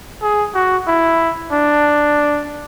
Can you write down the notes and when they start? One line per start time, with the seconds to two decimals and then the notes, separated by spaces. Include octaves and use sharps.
0.22 G#4
0.54 F#4
0.87 E4
1.52 D4